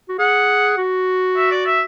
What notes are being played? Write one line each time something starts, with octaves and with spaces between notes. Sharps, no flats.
F#4
G#4 F#5
F#4
E5
D5
E5